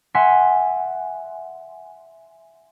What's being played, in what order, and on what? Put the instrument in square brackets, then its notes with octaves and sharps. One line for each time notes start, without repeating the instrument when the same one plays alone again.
[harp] E5 F#5 G#5 C6 B6